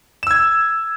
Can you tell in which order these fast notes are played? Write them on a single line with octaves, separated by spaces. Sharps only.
E7 E6 G#6